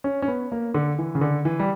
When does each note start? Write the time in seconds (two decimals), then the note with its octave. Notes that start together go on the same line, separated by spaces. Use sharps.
0.04 C#4
0.22 C#4
0.28 B3
0.52 A#3
0.74 D3
0.99 E3
1.15 C#3
1.21 D3
1.45 E3
1.60 G3